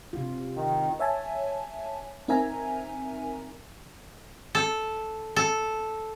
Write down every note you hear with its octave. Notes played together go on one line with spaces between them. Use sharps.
C3 F4
D#3
C#5 E5 G#5 A5
C4 D#4 A#4 E5 G#5 A#5
A4
A4